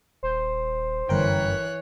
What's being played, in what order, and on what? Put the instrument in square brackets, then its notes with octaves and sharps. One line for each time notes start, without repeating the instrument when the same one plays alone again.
[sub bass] D#1 [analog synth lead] C5
[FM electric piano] G1 A#4 G5 [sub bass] F#2 [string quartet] E3 C#5 F#6